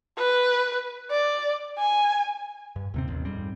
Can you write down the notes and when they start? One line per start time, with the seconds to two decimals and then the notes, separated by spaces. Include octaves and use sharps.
0.18 B4
1.11 D5
1.78 G#5
2.76 G2
2.94 D#2 C3 C4
3.08 A1 D#2
3.25 F2 G#2 G3 C4